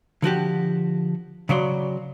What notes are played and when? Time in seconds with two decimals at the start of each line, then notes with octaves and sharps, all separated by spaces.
0.22 D3 F3 F#4 G4
1.49 C#3 F#3 D5 C6